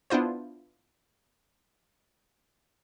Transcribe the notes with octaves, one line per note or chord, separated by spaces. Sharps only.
B3 D4 E4 F4 C5